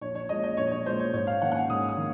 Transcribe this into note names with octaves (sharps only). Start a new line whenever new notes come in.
A#1 C#5
C#5
A#2 G#3 D#5
D#5
A#1 C#5
C#5
A#2 G#3 C5
C#5
G#2 C#5
F5
D#3 A#3 C#4 F#5
F#5
G#5
G#2 D#6
D#6
D#3 A#3 C#4